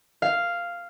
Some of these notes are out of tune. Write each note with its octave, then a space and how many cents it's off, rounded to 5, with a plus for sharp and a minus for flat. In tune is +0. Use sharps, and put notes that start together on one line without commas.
F5 -5